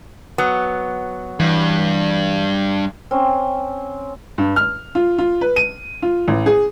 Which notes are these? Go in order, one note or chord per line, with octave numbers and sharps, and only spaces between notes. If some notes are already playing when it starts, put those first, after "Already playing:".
F#3 B3
G2 E3
C4 C#4
G2
F6
F4
F4
B4
D#7
F4
A1
G#4